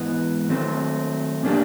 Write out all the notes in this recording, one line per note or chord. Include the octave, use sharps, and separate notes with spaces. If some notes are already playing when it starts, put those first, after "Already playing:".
Already playing: G#2 E3 G#3 B3
D#3 F#3 A3 C4
A#2 F#3 A#3 D4 G4